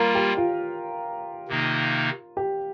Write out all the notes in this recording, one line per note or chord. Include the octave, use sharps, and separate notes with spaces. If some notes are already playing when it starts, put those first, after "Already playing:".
Already playing: G3 A#3 F4 A#4 F5
G4
F4
C3 D#3 A#3 D#4
G4